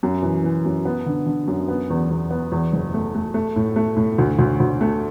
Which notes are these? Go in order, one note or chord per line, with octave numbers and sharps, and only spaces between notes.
F#2
E3
E3
F#2
B3
D3
D3
F#2
B3
E2
E2
B3
E2
F#1
A3
A3
A3
A2
A3
A2
D2
D2
D2
A3